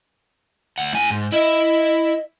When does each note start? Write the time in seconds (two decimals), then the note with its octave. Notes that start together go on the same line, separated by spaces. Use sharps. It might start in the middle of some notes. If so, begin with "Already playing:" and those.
0.78 D2 F#5
0.93 A2 G#5
1.10 G#2
1.32 E4 D#5 E5